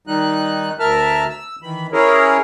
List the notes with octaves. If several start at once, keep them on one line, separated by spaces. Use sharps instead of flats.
D#3 G3 D#4 F#6
D2 A#4 E5 A5 F6
E6
D#3 E3 B5
C#4 E4 G#4 A#4 C#5